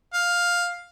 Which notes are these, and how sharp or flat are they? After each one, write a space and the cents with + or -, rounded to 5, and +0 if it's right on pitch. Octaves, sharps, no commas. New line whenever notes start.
F5 +10